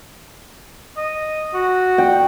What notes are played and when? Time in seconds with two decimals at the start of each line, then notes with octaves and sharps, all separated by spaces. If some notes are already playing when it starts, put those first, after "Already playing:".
0.97 D#5
1.54 F#4
1.98 G5